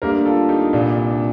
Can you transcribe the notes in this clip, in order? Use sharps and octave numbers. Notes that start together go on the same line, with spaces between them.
D2 D3 G3 A#3 G4 A#4
F4 A4
D#4 G4
C2 A#2 G3 D4 F4
D4
D4